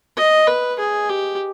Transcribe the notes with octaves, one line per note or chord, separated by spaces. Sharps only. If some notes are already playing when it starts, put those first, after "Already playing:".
D#5
B4
G#4
G4